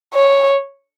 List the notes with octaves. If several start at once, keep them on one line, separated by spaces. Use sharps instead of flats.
C#5